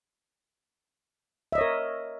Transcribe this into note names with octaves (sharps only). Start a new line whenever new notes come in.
A#4 C#5 D#5 E5